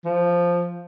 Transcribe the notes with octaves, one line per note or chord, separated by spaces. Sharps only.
F3